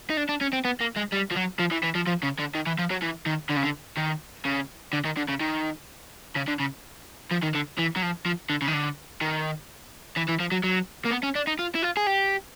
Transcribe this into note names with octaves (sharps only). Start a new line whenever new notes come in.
D#4
D4
D4
C#4
C4
B3
A#3
G#3
G3
F3
F#3
F3
E3
E3
F3
F3
C#3
D3
D#3
E3
F3
F#3
E3
D#3
D3
C#3
D3
D#3
C#3
D3
D#3
D3
C#3
D#3
C#3
D3
C#3
F3
D#3
D3
E3
F#3
F3
F3
D3
C#3
D#3
D3
D#3
E3
E3
F3
F#3
F#3
A#3
B3
C#4
D4
D#4
F4
E4
F4
G#4
G4